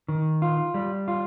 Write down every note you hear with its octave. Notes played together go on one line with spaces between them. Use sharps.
D#3
F4
G3
F4